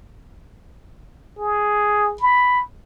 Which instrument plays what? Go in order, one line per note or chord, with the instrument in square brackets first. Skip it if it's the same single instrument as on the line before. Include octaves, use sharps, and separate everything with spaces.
[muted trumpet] G#4
B5